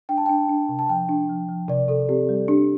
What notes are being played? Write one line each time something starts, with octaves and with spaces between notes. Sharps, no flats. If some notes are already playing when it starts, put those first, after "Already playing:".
D4 G5
A5
D4 G5
D4
C3
A5
F3 G5
D4
F3
F3
C3 D5
C3 A4
C4 G4
G3
D4 G4